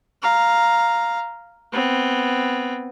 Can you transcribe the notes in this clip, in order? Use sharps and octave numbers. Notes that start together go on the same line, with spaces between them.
F5 A#5
B3 C4